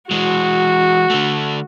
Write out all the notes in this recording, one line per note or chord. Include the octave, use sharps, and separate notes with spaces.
E3 G#3 F#4
D3 A3